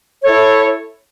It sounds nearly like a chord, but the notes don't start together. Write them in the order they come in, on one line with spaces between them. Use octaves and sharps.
C#5 A4 E4